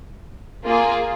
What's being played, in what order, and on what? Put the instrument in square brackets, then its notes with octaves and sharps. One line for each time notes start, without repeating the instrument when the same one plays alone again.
[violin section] A#3 F4 G#4